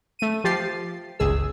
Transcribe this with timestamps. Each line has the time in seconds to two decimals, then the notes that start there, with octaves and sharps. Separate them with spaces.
0.19 A3 D#7
0.44 F3 G4 A6 C7
1.19 G1 C#2 G#4 E6